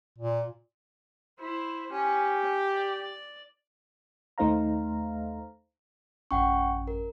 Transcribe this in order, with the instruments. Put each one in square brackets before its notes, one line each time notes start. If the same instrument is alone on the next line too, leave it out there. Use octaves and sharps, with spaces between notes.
[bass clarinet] A#2
[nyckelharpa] E4 C5
[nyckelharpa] C#4 [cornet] G4
[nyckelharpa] D5
[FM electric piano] D#2 A3 D#4 C5 F5 A#5
[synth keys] A1 F#2 C#4 [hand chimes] F#5 G5 C#6
[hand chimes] A#4